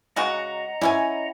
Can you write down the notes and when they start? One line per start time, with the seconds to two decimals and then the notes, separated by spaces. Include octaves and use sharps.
0.16 C#3 G#3 F#4 D#5 F#5 A#5
0.81 C#4 E4 C#5 G#5